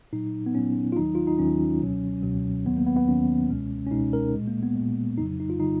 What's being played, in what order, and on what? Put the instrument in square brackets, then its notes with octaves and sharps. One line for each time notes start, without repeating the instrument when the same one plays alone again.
[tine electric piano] A#2 F#3 D#4
B3
A#2 F#3 C#4
F4
D#2 D#3 F#3 D#4
F4
D#4
D#2 D#3 F#3 C#4
C#2 B2 F#3
C#2 B2 F#3
D#2 D#3 F#3 B3
A#3
B3
B3
D#2 D#3 F#3 C#4
C#2 B2 G#3
C#4
C#2 B2 G#3 D#4
A#4
A#2 G#3
A#3
B3
A#2 G#3
F2 C#3 F#3 D#4
D#4
F4
C#3 F#3 D#4